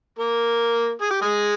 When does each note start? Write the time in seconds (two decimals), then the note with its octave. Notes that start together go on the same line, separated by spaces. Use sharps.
0.19 A#3 A#4
1.01 G#4
1.11 G4
1.22 G#3 G#4